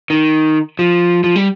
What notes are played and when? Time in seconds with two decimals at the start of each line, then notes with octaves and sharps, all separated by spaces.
0.10 D#3
0.79 F3
1.24 F3
1.36 G3